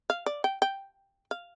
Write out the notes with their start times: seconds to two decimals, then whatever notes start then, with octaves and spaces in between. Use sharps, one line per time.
0.10 F5
0.26 D5
0.44 G5
0.62 G5
1.31 F5